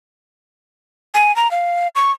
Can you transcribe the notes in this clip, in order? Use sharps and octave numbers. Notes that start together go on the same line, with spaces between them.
G#5
A#5
F5
C#6